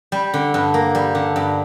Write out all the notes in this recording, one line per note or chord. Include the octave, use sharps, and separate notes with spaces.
G3
D3
G2
A#3
G3
D3
G2